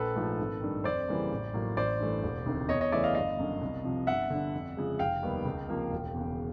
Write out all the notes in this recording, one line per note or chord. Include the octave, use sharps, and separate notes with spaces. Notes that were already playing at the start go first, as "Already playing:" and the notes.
Already playing: A#1 A4 B4
G#2 F3 A3
G#1
G2 D#3
F2 C5 D5
C#3 E3 G3 A#3
A1
A2 F#3 A#3
A1 C5 D5
G2 E3 A3
E1
D2 C3 D#3
E2 C#5 D#5
C#5 D#5
C#3 E3 A3 D5 E5
D#5 F5
G1 D#5 F5
F#2 D3
C2
C3 F3
G1 E5 F#5
G2 D3
F2
C#3 F3 G#3
F1 F5 G5
D#2 D#3 G3 B3
C#2
C3 F3 A#3
E1
E2 C#3